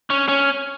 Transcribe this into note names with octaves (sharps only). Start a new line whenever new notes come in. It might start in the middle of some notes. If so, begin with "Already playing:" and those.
C#4
C#4